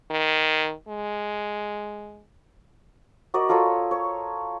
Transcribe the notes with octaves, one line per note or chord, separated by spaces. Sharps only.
D#3
G#3
F#4 A#4 D5 D#5
F4 A4 A#4 C#5
C#5